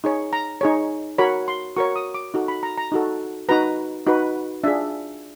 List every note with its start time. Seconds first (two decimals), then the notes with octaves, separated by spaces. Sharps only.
0.04 D#4 G#4 C#5
0.33 A#5
0.61 D#4 G#4 C#5
1.18 F#4 A#4 C#5 B5
1.48 C6
1.76 F#4 A#4 C#5 C#6
1.96 D#6
2.14 D6
2.34 D#4 F#4 A4
2.48 B5
2.63 A#5
2.78 A#5
2.92 D#4 F#4 A4
3.49 D#4 F#4 B4 A#5
4.06 D#4 F#4 B4
4.64 D4 F4 G#4 E5